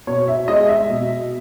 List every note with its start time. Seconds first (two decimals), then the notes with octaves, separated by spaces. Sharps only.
0.07 B2 C#5
0.28 E5
0.48 G#3 D#5
0.69 E5
0.90 B2